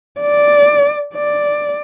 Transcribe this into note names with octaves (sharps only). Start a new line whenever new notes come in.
D5
D5